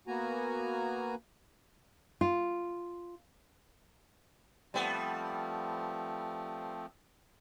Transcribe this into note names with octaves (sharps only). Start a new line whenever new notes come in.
A#3 B3 F#4 G#5 A#5
F4
F3 G3 A3 B3 C4